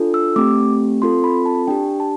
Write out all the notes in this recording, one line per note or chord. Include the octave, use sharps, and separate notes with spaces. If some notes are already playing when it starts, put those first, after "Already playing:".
Already playing: D4 F4 A4
E6
A3 C4 G4 D6
C4 F4 A4 C6
B5
A5
D4 G4 G5
A5